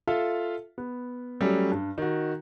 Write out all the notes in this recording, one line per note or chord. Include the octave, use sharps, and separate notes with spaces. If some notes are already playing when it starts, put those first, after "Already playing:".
F4 A4 E5 F5
B3
F#3 G3 A3 C#4
G2
D#3 F#4